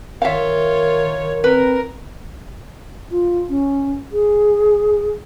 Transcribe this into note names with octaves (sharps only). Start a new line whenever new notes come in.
D#3 F4 A#4 C#5 E5 F5
C4 A#4 B4
F4
C#4
G#4